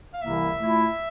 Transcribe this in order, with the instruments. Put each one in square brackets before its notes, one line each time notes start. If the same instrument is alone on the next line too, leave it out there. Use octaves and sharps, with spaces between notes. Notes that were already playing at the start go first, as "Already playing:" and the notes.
[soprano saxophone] F5
[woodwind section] C2 C3 E3 A#3 E4 [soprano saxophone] E5
[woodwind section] A#2 A3 E4